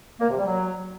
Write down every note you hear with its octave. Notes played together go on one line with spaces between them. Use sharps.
A#3
C3
G3
F#3